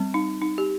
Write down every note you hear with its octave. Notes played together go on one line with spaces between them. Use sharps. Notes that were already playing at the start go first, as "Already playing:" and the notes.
Already playing: G3 C4
D#4
D#4
G4